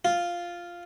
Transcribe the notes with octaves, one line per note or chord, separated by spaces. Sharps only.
F4